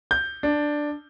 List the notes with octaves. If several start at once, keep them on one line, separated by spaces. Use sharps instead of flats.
G6
D4